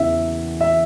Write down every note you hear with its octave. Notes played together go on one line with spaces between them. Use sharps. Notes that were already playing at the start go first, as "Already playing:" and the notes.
Already playing: E2 C#3 E3 E5
E5